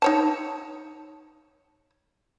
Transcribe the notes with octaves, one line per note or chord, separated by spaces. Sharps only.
D#4 C#5 A5